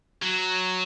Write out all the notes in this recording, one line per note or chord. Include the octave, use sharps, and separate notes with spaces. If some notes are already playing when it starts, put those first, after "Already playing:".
F#3